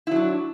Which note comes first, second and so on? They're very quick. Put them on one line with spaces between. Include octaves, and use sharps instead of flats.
E4 F#3 D4